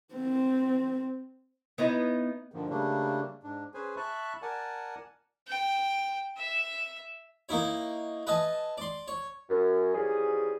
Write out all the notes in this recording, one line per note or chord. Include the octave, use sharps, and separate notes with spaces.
C4
B3 D#4 E4
G2 A#2 D3 D#3 F3
C#3 G3 A3 A#3 D4
G#2 D4
C#4 G#4 B4 C5 G#5
E5 A5 B5 C#6 F#6
A#4 D5 F#5 G#5 A5
G5
E5
A#3 D#4 E4 C#5
B4 D#5 E5 G#5 A5
D5 C6
C#5
F#2
E3 F3 G3 C#4 G#4